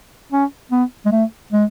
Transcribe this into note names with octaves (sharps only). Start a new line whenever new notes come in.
C#4
B3
G#3
A3
G#3